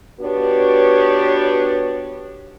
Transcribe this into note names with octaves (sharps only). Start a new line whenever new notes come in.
B3 D4 F#4 G4 B4 C#5